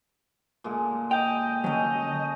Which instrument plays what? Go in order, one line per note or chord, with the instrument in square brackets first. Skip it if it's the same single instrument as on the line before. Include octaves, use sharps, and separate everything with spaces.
[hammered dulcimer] A#2 D3 G#3
[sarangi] D#5 [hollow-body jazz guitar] G5 [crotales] G6 F7
[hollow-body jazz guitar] D3 F#3 [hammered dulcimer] C#4 A4 [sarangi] D#5